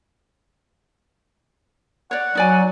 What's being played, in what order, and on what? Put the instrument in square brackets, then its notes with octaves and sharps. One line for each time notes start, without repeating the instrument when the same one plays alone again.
[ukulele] C#5 D5 [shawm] F#5
[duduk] F#3 [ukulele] D#4 D5 G#5